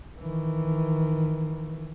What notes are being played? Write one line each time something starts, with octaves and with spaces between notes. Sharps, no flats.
D#3 E3